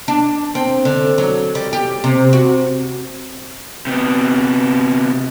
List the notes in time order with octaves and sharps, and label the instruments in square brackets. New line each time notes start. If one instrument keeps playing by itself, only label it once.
[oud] D4
C4
D3
F#3
G3
G4
C3
F#4
[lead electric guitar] C3 B3